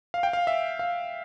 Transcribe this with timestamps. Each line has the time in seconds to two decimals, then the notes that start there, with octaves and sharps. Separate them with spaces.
0.14 F5
0.23 G5
0.33 F5
0.47 E5
0.79 F5